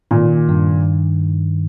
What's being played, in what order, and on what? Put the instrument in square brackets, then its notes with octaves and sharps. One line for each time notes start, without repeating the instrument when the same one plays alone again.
[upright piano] A#2 [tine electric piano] D#3
[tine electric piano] G2